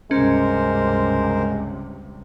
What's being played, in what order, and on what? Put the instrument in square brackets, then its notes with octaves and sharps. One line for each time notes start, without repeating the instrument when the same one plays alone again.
[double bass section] C#2 G2 C3 [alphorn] G#3 [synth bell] C#4 [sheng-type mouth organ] A#4 C5